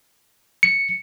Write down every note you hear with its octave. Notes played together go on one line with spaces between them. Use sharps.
C#7